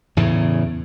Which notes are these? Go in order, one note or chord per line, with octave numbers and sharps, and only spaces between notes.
E2 A2 C#3